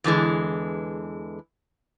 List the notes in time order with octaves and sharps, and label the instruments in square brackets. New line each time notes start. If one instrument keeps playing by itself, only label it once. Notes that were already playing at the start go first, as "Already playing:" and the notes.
[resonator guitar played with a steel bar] E2 D3 E3 G#3